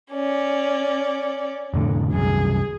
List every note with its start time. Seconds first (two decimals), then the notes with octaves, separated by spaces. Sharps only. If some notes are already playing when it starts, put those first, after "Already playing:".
0.12 C#4 D5
1.74 F1 A2 D3
2.13 C2 F#2 G#4